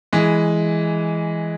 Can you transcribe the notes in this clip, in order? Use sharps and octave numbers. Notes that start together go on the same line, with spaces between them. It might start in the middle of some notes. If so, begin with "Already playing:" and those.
E3 G#3